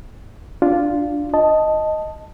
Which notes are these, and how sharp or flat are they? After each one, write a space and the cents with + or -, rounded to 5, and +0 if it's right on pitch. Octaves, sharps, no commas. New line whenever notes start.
D4 +0 F4 +0
D#5 +0 A5 +0